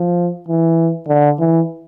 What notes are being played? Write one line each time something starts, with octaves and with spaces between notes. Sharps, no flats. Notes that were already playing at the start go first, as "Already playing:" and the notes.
Already playing: F3
E3
D3
E3